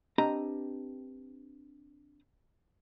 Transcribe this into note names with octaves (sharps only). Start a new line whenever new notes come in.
C4 D4 G4 B4 D#5 A#5